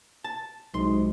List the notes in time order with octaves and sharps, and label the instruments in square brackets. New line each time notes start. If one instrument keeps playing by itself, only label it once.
[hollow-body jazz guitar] A5
[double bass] C2 G#3 [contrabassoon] G#2 [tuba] F#3 [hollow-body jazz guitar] C6